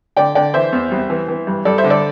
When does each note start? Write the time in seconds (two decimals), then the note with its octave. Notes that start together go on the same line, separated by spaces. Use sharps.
0.17 D3 D5 G5
0.35 D3 D5 G5
0.54 E3 C5 E5
0.73 E2
0.91 C2
1.10 E3
1.28 E3
1.47 G2
1.65 G2 A4 D5
1.78 C5 E5
1.84 D3
1.90 A4 D5